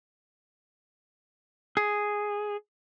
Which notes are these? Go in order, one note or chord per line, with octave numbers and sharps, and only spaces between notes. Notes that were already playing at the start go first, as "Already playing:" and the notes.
G#4